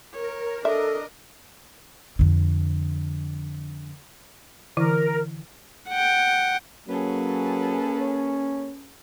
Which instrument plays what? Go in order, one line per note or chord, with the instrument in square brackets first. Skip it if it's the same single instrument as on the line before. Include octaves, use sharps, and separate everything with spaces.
[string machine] A#4 [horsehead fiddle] C#5
[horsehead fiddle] D4 D#5 [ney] A4 [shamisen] E5
[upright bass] F2 D3
[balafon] D3 E3 E4 [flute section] A#4
[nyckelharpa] F#5 G5
[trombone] F#3 [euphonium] A#3 [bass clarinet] C#4 [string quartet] G#4 A4 B4
[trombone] C#5